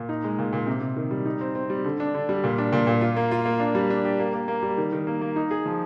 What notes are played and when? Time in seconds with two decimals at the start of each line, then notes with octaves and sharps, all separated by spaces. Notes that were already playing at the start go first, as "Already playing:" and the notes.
Already playing: A#2
0.09 D#4
0.24 G#3
0.39 A#2
0.53 A#2
0.67 C3
0.81 C3
0.97 D#3
1.11 G3
1.25 D#4
1.41 C4
1.55 C4
1.70 G3
1.84 D3
2.00 D4
2.14 D3
2.29 G3
2.44 A#2
2.58 D4
2.73 A#2
2.87 A#2
3.01 F4
3.16 A#3
3.31 F4
3.46 A#3
3.60 D4
3.75 G3
3.90 D4
4.05 G4
4.19 A#3
4.34 A#3
4.48 A#3
4.63 G3
4.78 D#3
4.93 D#3
5.07 A#3
5.21 A#3
5.36 D#4
5.51 G#4
5.65 F3